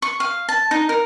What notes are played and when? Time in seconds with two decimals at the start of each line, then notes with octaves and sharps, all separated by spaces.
0.02 C#6
0.20 F5
0.49 A5
0.71 D#4
0.89 A#4